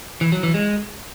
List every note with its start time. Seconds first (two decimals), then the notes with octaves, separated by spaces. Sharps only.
0.21 E3
0.32 F#3
0.43 E3
0.54 G#3